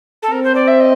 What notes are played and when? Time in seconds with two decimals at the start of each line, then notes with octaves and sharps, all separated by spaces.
0.22 A4
0.31 C4 A#4
0.43 C5
0.54 D5
0.67 E5
0.80 D#5